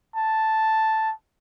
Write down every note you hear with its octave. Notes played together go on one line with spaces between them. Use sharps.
A5